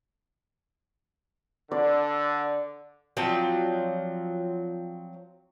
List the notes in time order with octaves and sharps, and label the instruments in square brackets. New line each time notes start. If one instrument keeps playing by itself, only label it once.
[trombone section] D3 [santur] D5
[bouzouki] F3 F#3 C4 D5